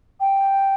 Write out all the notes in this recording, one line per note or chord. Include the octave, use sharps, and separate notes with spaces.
G5